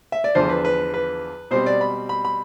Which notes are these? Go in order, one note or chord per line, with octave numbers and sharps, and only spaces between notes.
E5
D5
E2 D3 F3 C5
B4
B4
B4
B2 G3 C4 C5
D5
B5
B5
B5